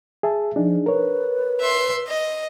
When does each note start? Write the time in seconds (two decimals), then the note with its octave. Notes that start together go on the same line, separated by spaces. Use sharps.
0.23 G#4 E5 A5
0.56 F3 D4 D#4 G#4
0.86 A#4 B4 C#5
1.61 E5 C6
2.08 D#5